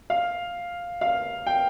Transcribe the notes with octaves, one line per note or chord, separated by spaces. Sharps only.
F5
F5
G5